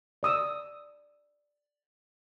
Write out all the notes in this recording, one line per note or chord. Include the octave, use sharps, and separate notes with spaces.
D5 D#6 E6